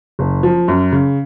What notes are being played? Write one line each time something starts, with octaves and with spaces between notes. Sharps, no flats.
F#1
F3
F#2
C#3